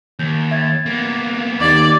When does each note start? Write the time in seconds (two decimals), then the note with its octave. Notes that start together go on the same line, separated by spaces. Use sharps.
0.19 D#2 G6
0.51 E5 G#6 A6
0.86 A#3 B3
1.61 D#2 D5 G#6